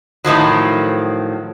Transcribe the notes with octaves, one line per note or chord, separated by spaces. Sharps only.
A2 D#3 F3 F#3